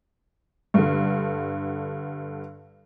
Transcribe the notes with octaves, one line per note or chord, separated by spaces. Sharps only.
G2 D3